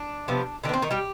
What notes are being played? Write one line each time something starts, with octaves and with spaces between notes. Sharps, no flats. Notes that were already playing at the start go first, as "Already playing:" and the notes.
Already playing: D4
C3 F3 B3
D3 D#3 D4
B3
C4
D#3 D#4
G3 G4